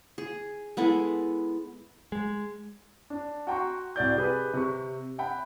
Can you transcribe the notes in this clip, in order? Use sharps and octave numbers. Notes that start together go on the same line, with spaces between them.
G#4
G#3 B3 E4 A4
G#3
D4
F#4 F#5 G5 A#5 C6 C#6
C2 F#4 D5 G6
G4 G#4 B4
C3 C#6
E5 F#5 G5 B5